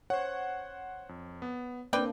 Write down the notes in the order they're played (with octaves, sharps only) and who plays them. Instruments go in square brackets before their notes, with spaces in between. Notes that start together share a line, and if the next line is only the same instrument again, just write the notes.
[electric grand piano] C5 F#5 [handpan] C#5
[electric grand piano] F2
B3
[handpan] A#3 D4 [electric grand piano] C4 [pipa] B4 D5 G5